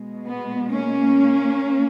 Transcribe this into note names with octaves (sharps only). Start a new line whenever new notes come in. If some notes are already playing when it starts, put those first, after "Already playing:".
Already playing: B2 G#3
B3
A#3 C#4